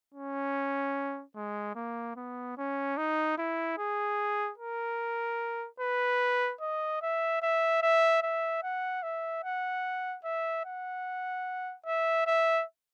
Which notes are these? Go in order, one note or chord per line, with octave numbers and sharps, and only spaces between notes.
C#4
G#3
A#3
B3
C#4
D#4
E4
G#4
A#4
B4
D#5
E5
E5
E5
E5
F#5
E5
F#5
E5
F#5
E5
E5